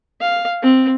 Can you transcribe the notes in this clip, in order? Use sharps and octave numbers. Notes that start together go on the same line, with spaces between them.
F5
C4